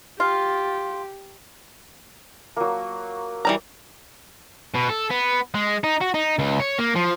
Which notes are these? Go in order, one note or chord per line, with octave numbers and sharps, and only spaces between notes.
F4 G4
F#3 A#3
E3 G3 A#5
B2
A4
B3
G#3
D#4
F#4
D#4
C#2
C#5
A#3
F3